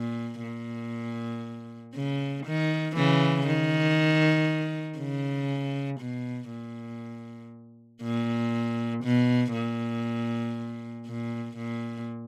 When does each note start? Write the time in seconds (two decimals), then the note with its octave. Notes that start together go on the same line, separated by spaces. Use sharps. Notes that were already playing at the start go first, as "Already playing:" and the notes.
Already playing: A#2
0.43 A#2
1.94 C#3
2.46 D#3
2.96 C#3 E3
3.47 D#3
4.99 C#3
6.00 B2
6.51 A#2
8.02 A#2
9.04 B2
9.54 A#2
11.06 A#2
11.57 A#2